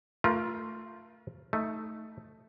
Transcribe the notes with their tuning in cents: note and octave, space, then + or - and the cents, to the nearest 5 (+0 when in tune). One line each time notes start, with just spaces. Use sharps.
A3 +25 F4 +0 A#4 +45
A3 +0 D#4 +15